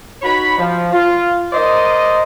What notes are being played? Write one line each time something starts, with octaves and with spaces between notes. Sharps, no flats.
D#4 F#4 C#5 B5
F3
F4
A#4 C5 D5 D#5